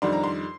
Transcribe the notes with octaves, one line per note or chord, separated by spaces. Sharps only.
F2 D#3 G3 D4 C6
A#5
C6